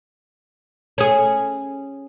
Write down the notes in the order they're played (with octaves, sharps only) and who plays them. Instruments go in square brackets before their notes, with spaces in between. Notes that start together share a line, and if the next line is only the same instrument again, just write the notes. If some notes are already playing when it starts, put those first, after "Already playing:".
[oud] C#4 G#4